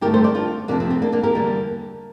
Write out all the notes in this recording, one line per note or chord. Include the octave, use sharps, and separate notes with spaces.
G2 D3 A3 G4 A#4
A4 C5
A#4 D5
D4 F4
F2 C3 F3 A#3 D4
C4
C4
A#3 D4
A#3 D4
G4 A#4
E2 D3 G3 A#3